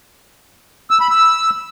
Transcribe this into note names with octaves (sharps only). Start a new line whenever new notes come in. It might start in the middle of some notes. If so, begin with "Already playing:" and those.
E6
B5
E6